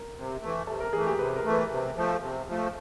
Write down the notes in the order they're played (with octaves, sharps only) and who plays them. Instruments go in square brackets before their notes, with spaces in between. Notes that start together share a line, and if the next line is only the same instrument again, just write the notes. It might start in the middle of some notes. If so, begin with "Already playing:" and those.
Already playing: [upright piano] A#4
[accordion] C3
E3 A3
[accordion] C3 [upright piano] A4
[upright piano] A#4
[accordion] E3 A3 [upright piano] G#4
[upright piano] G4
[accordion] C3 [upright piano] B4
[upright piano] A#4
[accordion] E3 A3
[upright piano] B4
[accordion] C3
F3 A3
C3
F3 A3